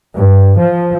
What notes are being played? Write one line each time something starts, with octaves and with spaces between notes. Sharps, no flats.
G2
F3